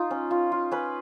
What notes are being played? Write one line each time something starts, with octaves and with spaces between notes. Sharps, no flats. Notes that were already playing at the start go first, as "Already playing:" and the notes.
Already playing: D#4 F4
C#4
F4
F4
C#4 B4